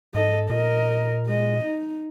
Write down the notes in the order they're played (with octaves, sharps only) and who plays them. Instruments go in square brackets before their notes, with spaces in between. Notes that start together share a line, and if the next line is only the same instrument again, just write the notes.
[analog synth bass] G#2 [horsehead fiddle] A4 D#5
[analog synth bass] A#2 [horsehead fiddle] A#4 D#5
[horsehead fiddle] G#3 D#5
D#4